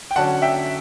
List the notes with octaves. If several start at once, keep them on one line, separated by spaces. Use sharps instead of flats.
G5
D3 F#3 C#4 F#5 A5
E5 G5